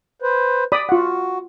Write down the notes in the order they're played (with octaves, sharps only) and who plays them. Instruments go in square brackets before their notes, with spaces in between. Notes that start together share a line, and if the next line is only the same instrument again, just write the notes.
[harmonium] B4 C5
[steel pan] D5 B5 D#6
[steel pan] F4 F#5 [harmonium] F#4